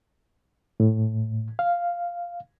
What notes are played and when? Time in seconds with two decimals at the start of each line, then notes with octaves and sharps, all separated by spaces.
0.80 A2
1.59 F5